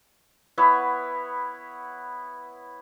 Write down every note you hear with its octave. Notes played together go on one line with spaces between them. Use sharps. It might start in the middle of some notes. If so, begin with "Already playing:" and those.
B3 E4 B4 C#5